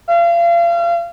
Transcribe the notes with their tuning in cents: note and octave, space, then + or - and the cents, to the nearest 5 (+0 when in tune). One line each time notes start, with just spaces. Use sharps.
F5 -35